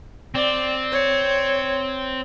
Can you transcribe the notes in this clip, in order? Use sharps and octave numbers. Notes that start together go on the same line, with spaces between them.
C4 D5
C#5